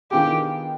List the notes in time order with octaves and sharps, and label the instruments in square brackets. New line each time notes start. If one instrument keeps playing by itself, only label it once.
[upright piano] D#3 B3 D4 F4 G#4 [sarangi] G4